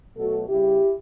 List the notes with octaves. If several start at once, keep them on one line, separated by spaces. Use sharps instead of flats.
B2 F#3 A3 F#4 A4
C#3 G3 E4 G4